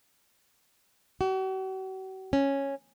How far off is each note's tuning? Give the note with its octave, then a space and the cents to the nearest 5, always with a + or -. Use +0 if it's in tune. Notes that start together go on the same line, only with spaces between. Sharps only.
F#4 +45
C#4 -5